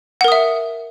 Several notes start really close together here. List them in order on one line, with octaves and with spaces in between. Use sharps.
F#5 A#4 D#6 E5